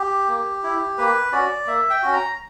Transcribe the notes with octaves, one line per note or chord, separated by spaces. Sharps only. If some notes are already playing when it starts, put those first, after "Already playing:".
Already playing: G4
A#3
E4
A#3 B4
C#4 F#4 D5
A#3 E5
G5
C#4 F#4
A#5